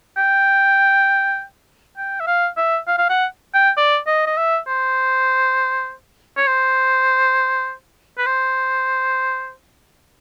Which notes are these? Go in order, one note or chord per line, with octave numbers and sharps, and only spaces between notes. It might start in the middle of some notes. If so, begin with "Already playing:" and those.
G5
G5
E5
F5
E5
F5
F5
F#5
G5
D5
D#5
D#5
E5
C5
C#5
C5
B4
C5